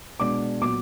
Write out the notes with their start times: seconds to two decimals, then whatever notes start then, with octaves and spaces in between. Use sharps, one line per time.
0.20 B2 G#3 B3 D4 D6
0.61 A#2 F#3 B3 D6